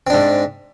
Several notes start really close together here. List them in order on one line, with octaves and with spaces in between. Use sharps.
C4 D4 G#2